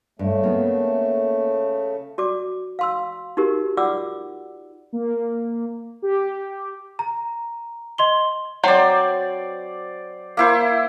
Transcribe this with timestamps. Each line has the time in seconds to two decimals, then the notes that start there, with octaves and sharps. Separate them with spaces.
0.19 G2 C#3 A3
0.43 A#3 B3
2.18 F#4 D5 D6
2.79 F5 C6 E6
3.37 D#4 F#4 G4 A#4
3.77 F4 D5 F#5 D6 E6
4.93 A#3
6.02 G4
6.99 A#5
7.98 D#5 C6 G7
8.64 F#3 C4 C5 D5
10.37 A#3 E4 C5